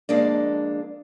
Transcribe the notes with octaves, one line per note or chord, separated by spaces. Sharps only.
F2 G#3 A#3 D4